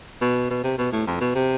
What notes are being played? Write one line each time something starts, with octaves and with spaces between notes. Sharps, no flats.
B2
B2
C3
B2
A2
F2
B2
C3